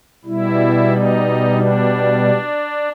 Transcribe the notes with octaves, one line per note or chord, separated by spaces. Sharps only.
B2 G3 E4
D#4
D4